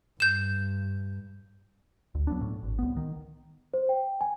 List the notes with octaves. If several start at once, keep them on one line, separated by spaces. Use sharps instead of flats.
G2 G6 E7
D2
F#3 B3 D4
A2
G#1
C2 B3
D#3
C5
G5
G#5